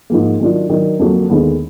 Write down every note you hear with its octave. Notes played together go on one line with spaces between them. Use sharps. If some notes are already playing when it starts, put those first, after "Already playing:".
G#2 F3 A#3
D#3 F#3 D4 F4
D#3 F#3 D4
F2 D3 F#3 A#3
D#2 D3 G#3 B3